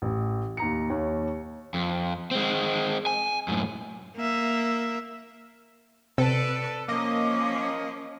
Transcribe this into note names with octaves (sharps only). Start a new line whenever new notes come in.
A1
D#2 A#5 C#7
D#2 C#5
F2
G#3 C4
G#5
F#2 A2
A#3 E5
C3 C4 A4 B4 D5
F3 A#3 C#4 D#5 D6